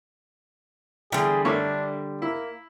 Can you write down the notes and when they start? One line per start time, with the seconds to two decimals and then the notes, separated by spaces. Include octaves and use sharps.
1.12 E2 D3 G3 G#4
1.45 A3 A#3 D4 C#5
2.22 A#3 E4